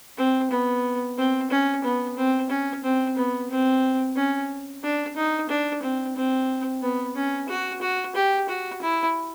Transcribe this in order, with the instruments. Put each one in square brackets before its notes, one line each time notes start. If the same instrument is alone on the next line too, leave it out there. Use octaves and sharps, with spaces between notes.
[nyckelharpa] C4
B3
C4
C#4
B3
C4
C#4
C4
B3
C4
C#4
D4
D#4
D4
C4
C4
B3
C#4
F#4
F#4
G4
F#4
E4